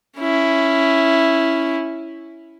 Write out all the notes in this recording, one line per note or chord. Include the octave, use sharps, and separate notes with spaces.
C#4 E4